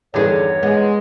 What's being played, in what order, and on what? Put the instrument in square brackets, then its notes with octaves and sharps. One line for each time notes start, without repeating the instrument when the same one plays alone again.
[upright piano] E2 G2 D#3 [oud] D3 G#4 [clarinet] C#5
[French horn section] G#3 [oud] B3